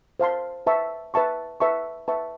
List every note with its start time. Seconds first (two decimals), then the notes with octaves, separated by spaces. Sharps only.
0.20 C5 F5 A5 C6
0.67 B4 E5 A5 C#6
1.14 B4 E5 A5 C#6
1.60 B4 E5 A5 C#6
2.08 B4 E5 A5 C#6